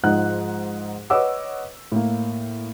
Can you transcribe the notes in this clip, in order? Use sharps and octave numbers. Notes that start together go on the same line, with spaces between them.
G#2 F3 D#4 F#5 F#6
B4 C#5 D#5 F#5 D6 E6
A2 A#3